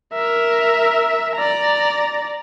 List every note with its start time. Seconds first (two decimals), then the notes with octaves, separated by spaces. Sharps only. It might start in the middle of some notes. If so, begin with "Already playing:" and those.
0.13 A#4 E5
1.35 D5 A#5